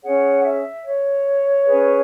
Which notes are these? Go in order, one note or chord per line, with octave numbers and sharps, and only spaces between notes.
C#4 G#4 C#5 F#5
E5
C#5
C#4 G#4 B4